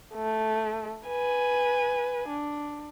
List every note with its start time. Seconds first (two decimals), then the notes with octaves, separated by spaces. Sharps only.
0.15 A3
1.07 B4 G#5
2.29 D4